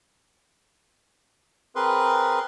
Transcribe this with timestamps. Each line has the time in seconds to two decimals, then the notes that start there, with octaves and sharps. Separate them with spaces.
1.75 C4 G#4 A#4 B4 C6